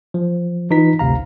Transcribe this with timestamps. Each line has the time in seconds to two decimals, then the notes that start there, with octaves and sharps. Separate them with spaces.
0.14 F3
0.70 E3 D#4 F4 B4 A#5 B6
0.99 G#1 D2 C3 F5 A#5